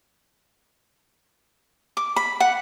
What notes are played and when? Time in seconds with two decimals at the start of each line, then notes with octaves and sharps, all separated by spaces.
1.97 D6
2.16 B5
2.40 F#5